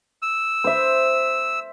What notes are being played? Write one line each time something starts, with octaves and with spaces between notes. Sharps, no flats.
E6
C5 E5